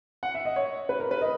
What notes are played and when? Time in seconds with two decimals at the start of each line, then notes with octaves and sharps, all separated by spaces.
0.23 F#5
0.35 E5
0.45 D#5
0.56 C#5
0.89 B4
1.00 A#4
1.11 B4
1.21 D#5